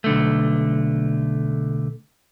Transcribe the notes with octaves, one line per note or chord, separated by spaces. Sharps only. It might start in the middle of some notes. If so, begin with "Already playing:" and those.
B1 D3 A3